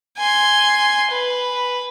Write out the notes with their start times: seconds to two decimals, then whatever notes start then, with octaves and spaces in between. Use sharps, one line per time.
0.18 G#5 C6
1.11 B4